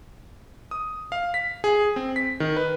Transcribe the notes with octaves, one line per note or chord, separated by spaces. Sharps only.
D#6
F5
B6
G#4
C4
B6
D#3
B4